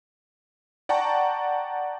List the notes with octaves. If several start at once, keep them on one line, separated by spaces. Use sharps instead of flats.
D5 F#5 G5 A5 A#5 C#6